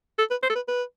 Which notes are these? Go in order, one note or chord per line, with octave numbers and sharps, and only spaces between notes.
A4
B4
C5
A4
B4
B4